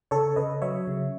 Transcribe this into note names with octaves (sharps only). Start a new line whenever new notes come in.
C#3 A4 C#5
C#3 B4 D#5
F#3 C#5 E5
C#3